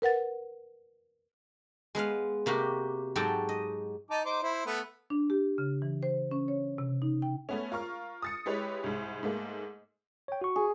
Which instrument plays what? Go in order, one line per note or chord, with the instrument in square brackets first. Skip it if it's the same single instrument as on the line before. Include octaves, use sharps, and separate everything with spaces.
[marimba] A#4 B4 F#5 A6
[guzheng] G#3 B3 B4 F5
C3 A#3 F#4 G4
G#2 F#3 F#4 G4 A4 G5
D#5
[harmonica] D#4 A5 D6
D#4 C5 D6
E4 C5
A3 B3
[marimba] D4
G4
C#3
E3
C5
C#4
C#5
C3
D#4
G5
[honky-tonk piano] A3 B3 C#4
F4 A#4 C#6 F6
D#6 A6 C#7
G#3 E4 G4 B4 C#5
C2 G#2
G#2 A3 A#3
[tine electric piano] C#5 G5
F#4 C#6
[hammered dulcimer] G#4